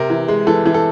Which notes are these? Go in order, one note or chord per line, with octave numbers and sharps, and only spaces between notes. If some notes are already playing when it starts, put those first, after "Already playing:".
Already playing: C3 A#4
E3
G#3
E3 A4
E3
A4